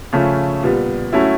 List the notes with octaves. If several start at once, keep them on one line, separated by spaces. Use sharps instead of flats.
C#3 F3 A3 C#4
A#2 G3 B3
F#3 A3 C#4 E4